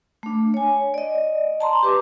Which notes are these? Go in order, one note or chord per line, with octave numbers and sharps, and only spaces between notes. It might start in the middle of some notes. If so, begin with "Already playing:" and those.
A3 D4
C#5 G#5
D5 D#5
A5 A#5 C6
G4 B4 D6